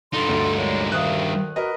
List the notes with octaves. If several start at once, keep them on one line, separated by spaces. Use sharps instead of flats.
G2 D3 D#4 F4 A4 C6
D2
A#2 G#3 C#5
D2 D#3 E5 F5 D#6 F#6
F#4 A#4 B4 D#5